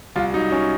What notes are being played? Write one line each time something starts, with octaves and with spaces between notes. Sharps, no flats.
C2 F4
F#3 D#4
F#3 C#4